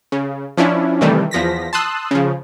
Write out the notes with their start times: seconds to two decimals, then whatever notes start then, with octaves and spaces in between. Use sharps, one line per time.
0.12 C#3
0.57 F3 C#4 D4 E4
1.01 C3 D#3 E3 G3 A3
1.31 E2 F3 A#6 B6
1.73 A5 C6 D#6 E6 F#6
2.11 C#3 F3